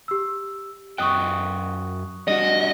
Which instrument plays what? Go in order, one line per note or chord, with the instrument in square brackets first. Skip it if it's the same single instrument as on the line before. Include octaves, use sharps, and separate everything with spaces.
[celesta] G4 E6
[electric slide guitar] F#2 D#5 G5 [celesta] C#6 D#6 F#6
[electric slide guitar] G3 D4 F#4 [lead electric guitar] D#5